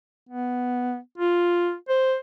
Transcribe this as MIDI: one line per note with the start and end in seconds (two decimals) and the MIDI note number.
0.29 0.98 59
1.18 1.75 65
1.89 2.16 72